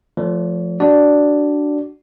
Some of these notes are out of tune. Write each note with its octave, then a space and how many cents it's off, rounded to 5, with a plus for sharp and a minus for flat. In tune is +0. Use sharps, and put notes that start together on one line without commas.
F3 +0 A3 +0 D5 -40
D4 +0 F#4 +25 D5 +0